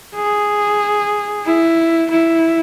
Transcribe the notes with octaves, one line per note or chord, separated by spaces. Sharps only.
G#4
E4
E4